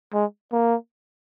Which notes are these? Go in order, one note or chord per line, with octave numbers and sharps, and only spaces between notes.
G#3
A#3